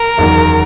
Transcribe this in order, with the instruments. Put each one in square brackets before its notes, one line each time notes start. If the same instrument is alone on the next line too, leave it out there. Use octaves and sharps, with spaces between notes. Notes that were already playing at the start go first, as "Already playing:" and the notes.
Already playing: [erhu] A#4
[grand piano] F#1 E2 D#3